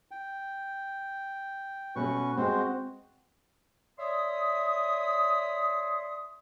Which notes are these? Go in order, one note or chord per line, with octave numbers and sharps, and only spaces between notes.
G5
B2 A3 B3 C#4 B4 C#6
G#3 C4 F#4 C5
C#5 D5 E5 C6 D#6